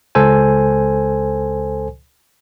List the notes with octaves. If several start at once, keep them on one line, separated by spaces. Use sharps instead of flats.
C#2 A4 C5 G#5